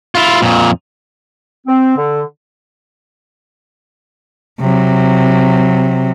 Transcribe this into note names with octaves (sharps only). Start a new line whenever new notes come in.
E4 F4
F2 A#2
C4
D3
C3 F#3